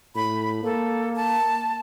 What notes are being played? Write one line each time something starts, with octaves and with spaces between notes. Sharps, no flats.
A2 B5
A#3 A4
A5